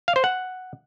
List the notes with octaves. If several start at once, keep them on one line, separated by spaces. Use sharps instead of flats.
F5
C5
F#5